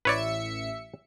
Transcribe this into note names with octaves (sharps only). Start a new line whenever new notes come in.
A1 B4 C#5 D5 E5 C#7